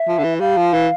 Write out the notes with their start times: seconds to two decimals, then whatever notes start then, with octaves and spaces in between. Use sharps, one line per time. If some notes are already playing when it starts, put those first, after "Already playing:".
Already playing: E5
0.08 F3
0.18 D3
0.24 E3
0.40 G3 F5
0.57 F3
0.74 E3